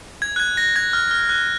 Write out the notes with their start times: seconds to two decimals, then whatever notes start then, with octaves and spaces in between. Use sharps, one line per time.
0.22 G#6
0.36 F#6
0.40 G#6
0.57 A#6
0.76 G#6
0.93 F6
1.11 F6
1.29 F#6